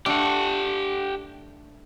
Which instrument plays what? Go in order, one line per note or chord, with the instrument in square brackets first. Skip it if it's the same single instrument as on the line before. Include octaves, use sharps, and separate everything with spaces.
[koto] A3 D4 [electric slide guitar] G4 F#5